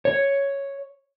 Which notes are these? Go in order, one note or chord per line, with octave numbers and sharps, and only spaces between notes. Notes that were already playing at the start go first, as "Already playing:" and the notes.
C#5